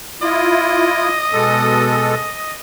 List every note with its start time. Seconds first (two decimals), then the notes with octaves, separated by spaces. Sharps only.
0.22 E4 F4 D#5
1.33 B2 G#3 A4